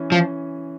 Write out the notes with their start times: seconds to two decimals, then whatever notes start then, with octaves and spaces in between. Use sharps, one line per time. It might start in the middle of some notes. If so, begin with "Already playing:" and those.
Already playing: E3 C#4
0.12 F3 C#4